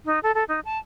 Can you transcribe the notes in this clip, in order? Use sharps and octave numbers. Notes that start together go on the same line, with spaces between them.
D#4
A4
A4
D#4
A5